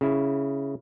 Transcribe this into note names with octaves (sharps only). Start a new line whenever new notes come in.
C#3 E4